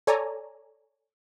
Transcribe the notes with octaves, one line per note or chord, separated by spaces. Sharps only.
A4 C#5 D5 G#5 A#5